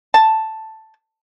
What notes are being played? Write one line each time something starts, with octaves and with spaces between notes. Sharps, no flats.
A5